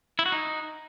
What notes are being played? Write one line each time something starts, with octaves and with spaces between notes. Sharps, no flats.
E4
F#4
D#4